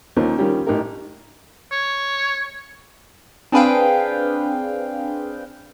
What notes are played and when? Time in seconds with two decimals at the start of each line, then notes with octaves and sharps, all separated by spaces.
0.17 D#2 F3 A#3 C4 C#4 D#4
0.38 D#3 F3 G3 C#4 G4
0.67 A1 D#4 G4 A#4
1.72 C#5
3.52 C4 D4 G#4 B4 F5 G5